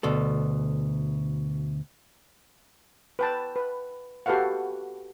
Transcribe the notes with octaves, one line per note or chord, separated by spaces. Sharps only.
D2 B2 A4
B4 G5 A5
B4
F#4 G4 A4 B4 F5 F#5